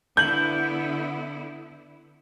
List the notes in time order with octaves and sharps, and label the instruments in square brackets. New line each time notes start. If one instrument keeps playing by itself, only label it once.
[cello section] D3 B3 E4 [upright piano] G6 F#7